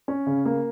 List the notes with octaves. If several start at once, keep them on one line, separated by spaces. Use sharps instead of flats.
C#4
C#3
A#3